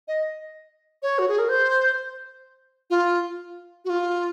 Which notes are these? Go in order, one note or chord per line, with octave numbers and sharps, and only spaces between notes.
D#5
C#5
F#4
G#4
A#4
C5
F4
F#4
F4